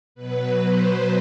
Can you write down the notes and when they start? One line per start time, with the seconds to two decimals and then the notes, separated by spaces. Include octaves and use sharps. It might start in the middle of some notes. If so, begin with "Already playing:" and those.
0.15 B2 F#3 B4
0.60 C5